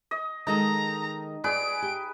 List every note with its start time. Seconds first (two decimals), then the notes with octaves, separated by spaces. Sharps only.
0.11 D#5
0.47 D#3 G#3 D#4 A4 A#5
1.44 G#4 B4 D5 D7
1.82 G4